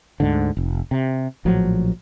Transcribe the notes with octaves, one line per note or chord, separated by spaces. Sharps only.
D2 G#2 D3
F1
C3
A#1 A2 F3 F#3